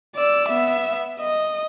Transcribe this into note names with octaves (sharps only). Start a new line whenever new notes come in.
D5 E6
B3 E5
D#5